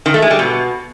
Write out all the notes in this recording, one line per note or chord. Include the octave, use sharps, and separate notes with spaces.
D#3
A3
G#3
G3
B2